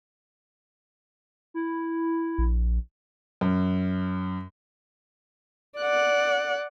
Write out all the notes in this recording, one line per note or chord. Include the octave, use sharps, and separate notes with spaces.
E4
A#1
F#2
D5 F#5